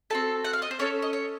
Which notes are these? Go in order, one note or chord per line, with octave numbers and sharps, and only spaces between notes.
C4 F#4 A4 A5
F#5
F5
D#5
C5
C#4 A4 C#5
D#5
C#5